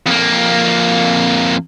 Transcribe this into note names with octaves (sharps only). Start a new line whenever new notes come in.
F2 A#3